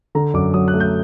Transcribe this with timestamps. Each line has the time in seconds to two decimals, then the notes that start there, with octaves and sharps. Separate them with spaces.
0.15 D3 A#5
0.34 F#2 D6
0.54 F#3 D#6
0.68 F#6
0.74 A3
0.80 G6